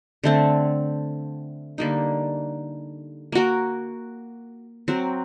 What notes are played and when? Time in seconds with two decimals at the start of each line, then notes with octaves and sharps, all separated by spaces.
0.24 D3 A3 C4
1.78 D3 G3 A#3 D#4
3.32 A#3 F#4 A#4
4.88 F#3 C4 F#4 A#4